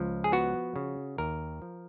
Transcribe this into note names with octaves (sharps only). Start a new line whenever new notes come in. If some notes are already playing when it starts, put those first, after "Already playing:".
Already playing: C#2 F3
G#4
B3 F#4
C#3
D#2 A#4
F3